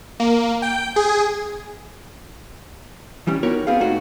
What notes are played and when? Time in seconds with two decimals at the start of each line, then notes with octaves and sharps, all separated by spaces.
0.20 A#3
0.62 G5
0.96 G#4
3.27 D#3 E3 G3 C#4
3.43 B3 D#4 F#4 G4 A#4 C#5
3.67 B3 C4 G#4 F5
3.80 A#2 A3 D#4 F#4